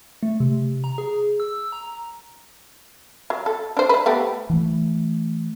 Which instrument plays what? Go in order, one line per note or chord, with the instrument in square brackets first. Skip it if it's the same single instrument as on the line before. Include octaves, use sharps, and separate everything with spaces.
[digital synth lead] A3
C3
A#5
G#4
E6
A#5
[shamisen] F#3
A4
D4 C5
B4 C5
A3 B3 G4
[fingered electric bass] E3 A3